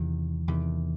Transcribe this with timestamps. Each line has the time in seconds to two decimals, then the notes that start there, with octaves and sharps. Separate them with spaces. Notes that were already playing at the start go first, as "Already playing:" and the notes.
Already playing: E2 C3 D#3
0.48 E2 C3 D#3